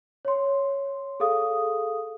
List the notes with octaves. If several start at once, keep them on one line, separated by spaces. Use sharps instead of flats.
C#5 C6
G#4 A4 F5 D#6